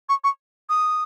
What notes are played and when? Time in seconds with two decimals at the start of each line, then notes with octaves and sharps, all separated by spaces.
0.09 C#6
0.24 C#6
0.69 D#6